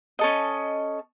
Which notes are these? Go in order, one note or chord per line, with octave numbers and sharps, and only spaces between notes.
C#4 A4 D#5